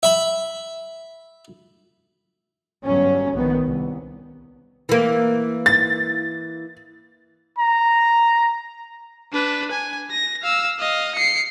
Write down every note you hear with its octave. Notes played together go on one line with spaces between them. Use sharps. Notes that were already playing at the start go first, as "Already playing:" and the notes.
E5 B5
G1 F#3 C#4
A#1 D#3 B3
C2
E3 A#3
A6
A#5
D4 B4
G#5
A#6
F5 E6
D#5 F5
C7 C#7